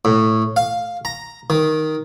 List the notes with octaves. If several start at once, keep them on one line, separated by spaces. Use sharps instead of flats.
A2
F5
A#5
D#3